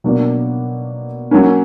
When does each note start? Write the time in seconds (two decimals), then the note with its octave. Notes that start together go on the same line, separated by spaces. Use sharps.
0.04 B2 F#3 A#3 D4
1.31 F#3 A#3 C#4